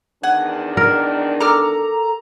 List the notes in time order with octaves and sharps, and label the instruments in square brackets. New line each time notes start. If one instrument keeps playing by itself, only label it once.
[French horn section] E2 D#3 D4 [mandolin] F#5 G#5
[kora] A#4
[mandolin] A4 D6 F6 [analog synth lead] A#5